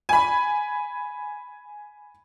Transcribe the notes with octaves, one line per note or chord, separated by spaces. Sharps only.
G#5 B5